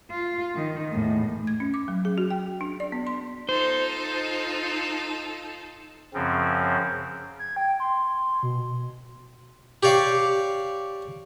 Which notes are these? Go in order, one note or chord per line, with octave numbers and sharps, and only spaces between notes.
F4
D#3
E2 A2
G#6
C#4
D6
F#3
G#4
F#4
G5
D4
D5
B3
C6
D#4 F4 A4 C5
F#2 C#3 F3 C4
G#6
G5
C6
B2
G4 C#5 D5 F5